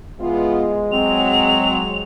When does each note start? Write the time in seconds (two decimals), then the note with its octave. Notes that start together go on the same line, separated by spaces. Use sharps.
0.20 E3 G#3 B3 F4
0.92 F#3 C4 F7